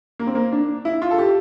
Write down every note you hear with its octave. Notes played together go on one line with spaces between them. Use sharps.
A#3
C4
A#3
D4
E4
F4
A4
G4